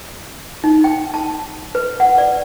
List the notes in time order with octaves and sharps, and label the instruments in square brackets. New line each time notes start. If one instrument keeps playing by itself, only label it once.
[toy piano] D#4
G5
A5
B4
F#5
D5